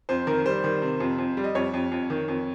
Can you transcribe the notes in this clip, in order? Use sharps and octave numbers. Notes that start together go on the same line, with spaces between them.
F2 C5
D#3 A#4
G3 C5
D#3
C3
F2
F2
G3
D#5
F2 C#5
F2
F2
D#3
F2